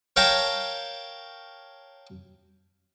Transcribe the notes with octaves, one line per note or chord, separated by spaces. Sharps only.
A#4 C#5 F5 G5 A5 A#5